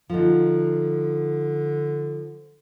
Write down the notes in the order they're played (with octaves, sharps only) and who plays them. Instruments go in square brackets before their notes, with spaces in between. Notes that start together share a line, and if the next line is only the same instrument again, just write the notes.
[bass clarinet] D3 [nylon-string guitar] F3 D#4